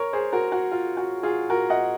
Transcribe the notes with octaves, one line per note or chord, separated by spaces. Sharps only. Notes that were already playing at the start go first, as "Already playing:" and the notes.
Already playing: A#4 C#5
G#4 C5
F#4 A#4
F#4
F4
F#4
F4 G#4
F#4 A#4
D#5 F#5